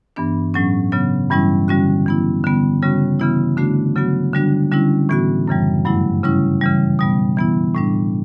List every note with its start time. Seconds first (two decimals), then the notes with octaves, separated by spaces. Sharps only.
0.16 G2 E3 B3 D4
0.54 A2 F#3 C#4
0.92 C#3 F#3 B3
1.31 G2 E3 G3 C#4 E4
1.68 D3 G3 C#4 F#4
2.06 E3 B3 E4
2.44 D3 G3 B3
2.82 C#3 G3 C#4 F#4
3.20 C#3 E3 B3 E4
3.57 D3 A3 D4 F#4
3.95 C#3 F#3 B3 F#4
4.33 D3 G3 D4 F#4
4.72 D3 G3 C#4 E4
5.09 A2 E3 B3 F#4
5.48 F#2 C#3 E3 G3
5.85 G2 F#3 A3 E4
6.23 C#3 G3 C#4 E4
6.61 C#3 E3 G3
6.99 B2 G3 B3
7.37 E3 B3 E4
7.75 A2 G3 D4